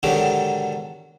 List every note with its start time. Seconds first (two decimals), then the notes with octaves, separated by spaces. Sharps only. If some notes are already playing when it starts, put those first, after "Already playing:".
0.03 G#2 B2 D3 D#3 F#3 G4